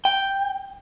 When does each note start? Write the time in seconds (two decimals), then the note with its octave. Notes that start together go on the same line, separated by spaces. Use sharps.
0.05 G5